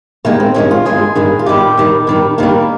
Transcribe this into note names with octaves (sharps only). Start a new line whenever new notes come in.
G2 D#3 G#3 A#3
C4
G2 D#3 G#3 C#4
F4
G2 D#3 G#3 G#4
G2 D#3 G#3
F4
G2 D#3 G3 G4
G2 D#3 G3
G2 D#3 G3
G2 D#3 G3 A#3